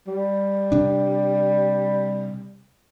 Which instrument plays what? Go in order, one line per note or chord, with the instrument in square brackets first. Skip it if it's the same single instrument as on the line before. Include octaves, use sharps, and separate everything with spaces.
[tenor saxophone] G3
[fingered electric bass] C3 D4